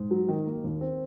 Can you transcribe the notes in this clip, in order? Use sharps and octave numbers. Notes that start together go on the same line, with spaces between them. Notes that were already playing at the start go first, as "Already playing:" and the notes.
Already playing: G#2
F#3
D#3
A#3
D#2
C4